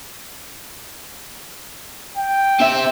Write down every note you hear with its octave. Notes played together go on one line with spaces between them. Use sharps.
G5
C4 E5